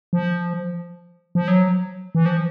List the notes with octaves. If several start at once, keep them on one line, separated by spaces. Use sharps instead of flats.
F3
F3
F#3
E3
F3